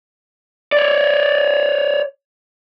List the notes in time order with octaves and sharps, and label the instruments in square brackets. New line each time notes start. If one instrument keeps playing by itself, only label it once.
[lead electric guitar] C#5 D5